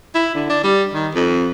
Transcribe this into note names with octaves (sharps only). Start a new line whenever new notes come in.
E4
D3
D4
G3
D#3
F2